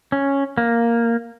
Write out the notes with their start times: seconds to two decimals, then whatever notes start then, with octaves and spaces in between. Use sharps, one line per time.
0.12 C#4
0.58 A#3